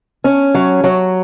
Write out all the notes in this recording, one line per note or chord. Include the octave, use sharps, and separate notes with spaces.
C#4
F#3
F#3